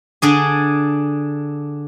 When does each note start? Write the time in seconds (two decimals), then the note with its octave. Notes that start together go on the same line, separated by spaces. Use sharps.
0.22 D3 D4 G#4